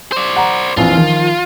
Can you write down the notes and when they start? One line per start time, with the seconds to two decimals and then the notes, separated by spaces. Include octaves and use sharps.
0.12 C5 D5
0.36 F#5 A#5
0.77 A#1 F2 E3 F4
0.96 D#3 F3